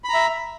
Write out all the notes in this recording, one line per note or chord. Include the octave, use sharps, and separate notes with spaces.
E5 A#5 B5